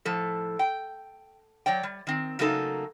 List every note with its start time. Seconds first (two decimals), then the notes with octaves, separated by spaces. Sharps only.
0.05 A2 F3 A4
0.59 G5
1.66 F#3 C#5 D5 G5
1.83 G3
2.07 D#3 C4
2.39 C#3 F#3 A3 A#3 D#4 A4